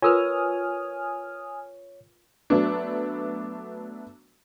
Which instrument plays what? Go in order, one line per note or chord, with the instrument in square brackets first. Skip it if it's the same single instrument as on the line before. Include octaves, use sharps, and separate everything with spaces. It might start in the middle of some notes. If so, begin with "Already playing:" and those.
[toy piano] F4 A#4 B4 [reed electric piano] C#5 [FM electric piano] G#5 D#6 F6
[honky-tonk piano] F#3 A3 B3 D4